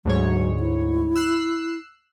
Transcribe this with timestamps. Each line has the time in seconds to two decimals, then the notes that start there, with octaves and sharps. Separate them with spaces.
0.05 D2 G#2 F#3 C#5
0.60 E4
1.16 E6 F#6 C7